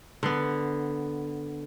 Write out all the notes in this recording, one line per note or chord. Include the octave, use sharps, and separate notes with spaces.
D3 B3